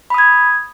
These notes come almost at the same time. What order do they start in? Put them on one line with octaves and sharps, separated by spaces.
B5 D#6 G#6